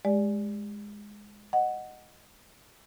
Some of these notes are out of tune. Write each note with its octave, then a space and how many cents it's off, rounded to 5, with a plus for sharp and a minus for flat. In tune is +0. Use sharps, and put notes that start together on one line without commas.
G#3 +0 G4 +25 D5 +0
D#5 -10 F#5 +0